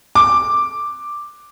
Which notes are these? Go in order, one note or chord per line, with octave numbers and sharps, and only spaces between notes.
D6